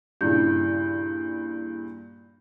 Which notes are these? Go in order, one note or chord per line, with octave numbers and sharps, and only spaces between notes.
G2 A#2 C#3 E4 G6